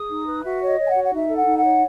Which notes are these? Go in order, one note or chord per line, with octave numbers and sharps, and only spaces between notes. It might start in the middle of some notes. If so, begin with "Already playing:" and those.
Already playing: G#4 D#6
D#4
B4
F#4 E5
C#5 D#5
C#5
G#5
F#5
F#4
F#5
D#4 E5
A4
F#5
D#4
F#5
C#5